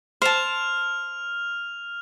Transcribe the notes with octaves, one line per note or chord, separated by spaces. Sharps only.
C5 A5 F6 F7